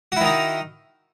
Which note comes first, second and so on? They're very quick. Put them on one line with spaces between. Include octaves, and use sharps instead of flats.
F#4 E4 D#3 D#4